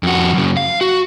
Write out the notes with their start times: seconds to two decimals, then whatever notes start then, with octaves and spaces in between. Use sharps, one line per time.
0.03 F2 F#4
0.34 F#2 C#3
0.57 F5
0.81 F#4